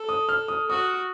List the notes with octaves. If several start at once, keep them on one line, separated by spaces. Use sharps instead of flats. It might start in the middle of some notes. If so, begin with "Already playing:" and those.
Already playing: A4
D#6
F6
D#6
F#4 D#6